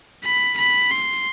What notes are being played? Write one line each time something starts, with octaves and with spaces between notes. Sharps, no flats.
B5
B5
C6